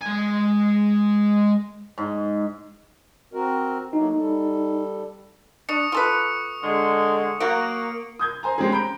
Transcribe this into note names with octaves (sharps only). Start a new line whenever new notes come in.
G#3 G#5
G#2
C4 F#4 A#4
F#3 A3 A#3 D#4
G3 A4
D4 C#6 D#6 C#7
F4 A4 B4
D3 G#3
F#3 A#3 F#4 D7
D#6 G6 G#6
C5 G#5 A#5
G#3 C4 C#4 G4 G#4
A#5 B5 G6 D7